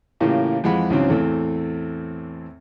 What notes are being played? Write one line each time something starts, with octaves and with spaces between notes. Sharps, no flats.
A2 C#3 E3 A#3 F4 G4
F2 E3 G#3 F4 F#5 B5
C#2 G#2 C#3 E3 F#3 C4
E2 A2 E3 A3 C4